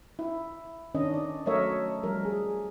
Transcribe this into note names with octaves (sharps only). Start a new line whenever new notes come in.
E4
D#3 C#4 D4 D#5
D5
F#3 A3 A#4 C#5 D#5 E5
F3 G3 A#4
G#4